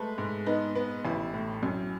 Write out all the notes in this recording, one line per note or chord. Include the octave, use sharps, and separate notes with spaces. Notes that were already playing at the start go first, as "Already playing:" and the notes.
Already playing: G#3 A3 B4
G#2
B3 D#4
B3
A1 E4
A2
F#2